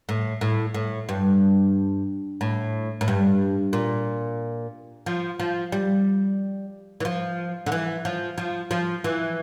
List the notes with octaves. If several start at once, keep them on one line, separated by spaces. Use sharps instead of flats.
A2
A2
A2
G2
A2
A2
G2
A#2
F3
F3
G3
E3
F3
D3
E3
F3
F3
F3
E3